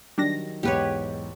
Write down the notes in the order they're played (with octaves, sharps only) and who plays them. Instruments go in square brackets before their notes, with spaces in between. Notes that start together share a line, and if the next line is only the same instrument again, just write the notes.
[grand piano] D#3 F#3 [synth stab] G3 D4 A#6
[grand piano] B1 E2 G#2 [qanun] G4 B4 C#5